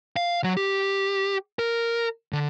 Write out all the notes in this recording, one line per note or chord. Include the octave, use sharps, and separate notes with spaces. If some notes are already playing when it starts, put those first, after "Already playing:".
F5
F#3
G4
A#4
D3